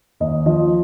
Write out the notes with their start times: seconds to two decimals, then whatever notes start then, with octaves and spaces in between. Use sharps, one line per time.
0.20 D#2 D#5
0.46 F3 D#5